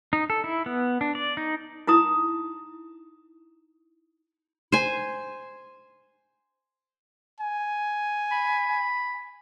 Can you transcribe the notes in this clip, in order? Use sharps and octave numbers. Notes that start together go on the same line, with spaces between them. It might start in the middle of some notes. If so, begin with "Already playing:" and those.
D#4
A4
E4
B3
D4
D5
D#4
D#4 E4 A#5 D#6
C5 G#5
G#5
B5